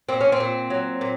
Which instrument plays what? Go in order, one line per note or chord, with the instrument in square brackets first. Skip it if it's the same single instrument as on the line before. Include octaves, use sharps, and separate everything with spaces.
[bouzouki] A#2 C4
C#4
C4
A#2
F#3
A#2